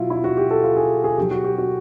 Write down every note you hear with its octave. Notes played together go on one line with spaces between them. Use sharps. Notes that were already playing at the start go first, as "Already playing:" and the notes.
Already playing: B2 F#3 E4 F4
E4
F#4
G4
A4
F4
G#4
G#4
B2 F#3 G4
F#4
G4
F#4